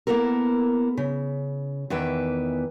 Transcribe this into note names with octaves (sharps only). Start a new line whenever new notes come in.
A#3 B3 E4 A4 A#4
C#3
E2 D#3 E3 B4 E5 G5